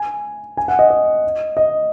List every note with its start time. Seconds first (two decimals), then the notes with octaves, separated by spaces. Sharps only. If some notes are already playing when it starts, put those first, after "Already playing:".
Already playing: G#5
0.57 G#5
0.68 F#5
0.79 D#5
0.90 D#5
1.57 D#5